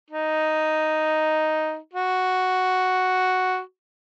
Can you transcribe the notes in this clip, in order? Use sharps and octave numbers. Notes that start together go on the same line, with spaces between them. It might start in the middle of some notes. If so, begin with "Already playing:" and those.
D#4
F#4